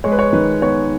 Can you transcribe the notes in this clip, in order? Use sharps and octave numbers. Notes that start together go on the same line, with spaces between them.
G#3 C#5
B4
C#5
D#3 B4
B3 C#5